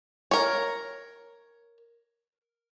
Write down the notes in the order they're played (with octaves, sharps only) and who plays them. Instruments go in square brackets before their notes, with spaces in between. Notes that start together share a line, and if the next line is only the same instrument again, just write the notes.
[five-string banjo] A#4 C#5